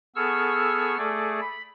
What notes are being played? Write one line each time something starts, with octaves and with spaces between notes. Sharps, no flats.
B3 G#4 A4 C#6 E6 F6
A3 G#4 A4 D5
B5